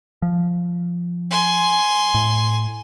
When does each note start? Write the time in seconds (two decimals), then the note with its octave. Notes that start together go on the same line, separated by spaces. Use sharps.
0.22 F3
1.31 G#5 C6
2.14 A2